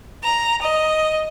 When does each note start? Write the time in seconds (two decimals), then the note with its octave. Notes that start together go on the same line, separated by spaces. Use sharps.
0.24 A#5
0.63 D#5